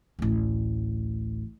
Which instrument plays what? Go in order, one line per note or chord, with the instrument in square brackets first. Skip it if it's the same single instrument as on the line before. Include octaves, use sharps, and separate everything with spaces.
[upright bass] A1 D2